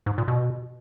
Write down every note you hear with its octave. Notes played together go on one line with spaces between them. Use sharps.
G#2
A#2
B2